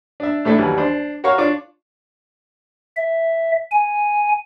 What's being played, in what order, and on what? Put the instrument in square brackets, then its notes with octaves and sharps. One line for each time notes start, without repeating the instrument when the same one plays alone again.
[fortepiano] D4 E5
A2 A3 D4 E4 A4
D#2 E3 F#3 G3
D4 C5
F#4 A#4 C#5 F5 C#6
D4 F4 C#5 C#6 D6
[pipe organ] E5
G#5